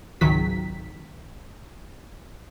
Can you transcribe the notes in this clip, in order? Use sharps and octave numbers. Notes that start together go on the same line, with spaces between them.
G#1 C#2 D#3 F#3 B6